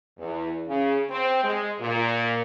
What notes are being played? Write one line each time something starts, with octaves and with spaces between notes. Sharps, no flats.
E2
C#3
C4
G#3
A#2